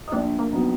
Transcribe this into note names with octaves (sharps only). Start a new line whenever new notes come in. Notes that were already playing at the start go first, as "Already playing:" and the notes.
D#4
A#1 D4
A#3
F#3 B3 D#4